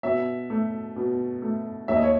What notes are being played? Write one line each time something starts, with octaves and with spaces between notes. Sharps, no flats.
B2 E5
A3
B2
A3
D#2 E5
D#5
C#5